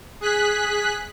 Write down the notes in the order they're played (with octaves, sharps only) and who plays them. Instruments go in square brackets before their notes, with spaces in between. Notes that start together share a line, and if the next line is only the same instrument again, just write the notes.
[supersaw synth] G#4 F#6 B6